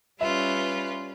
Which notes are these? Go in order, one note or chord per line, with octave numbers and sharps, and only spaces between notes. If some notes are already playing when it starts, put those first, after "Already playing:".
G3 C#4 F4 B4 E5